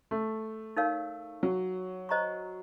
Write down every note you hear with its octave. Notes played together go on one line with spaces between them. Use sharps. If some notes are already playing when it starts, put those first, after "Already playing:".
A3
D#4 A#4 C#5 F5
F#3
C5 D#5 A#5 C#6